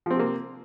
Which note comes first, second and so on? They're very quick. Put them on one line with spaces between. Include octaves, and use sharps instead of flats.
F3 C4 C3 A#3